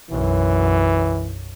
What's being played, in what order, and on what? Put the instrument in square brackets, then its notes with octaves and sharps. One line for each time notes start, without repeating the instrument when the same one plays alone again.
[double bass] B1 F#2 [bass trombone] E3